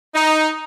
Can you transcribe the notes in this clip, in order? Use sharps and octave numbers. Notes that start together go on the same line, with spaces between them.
D#4